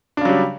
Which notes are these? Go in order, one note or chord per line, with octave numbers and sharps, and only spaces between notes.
C#3 F#3 G3 D4